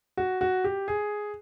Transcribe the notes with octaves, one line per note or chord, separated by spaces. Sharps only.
F#4
F#4
G4
G#4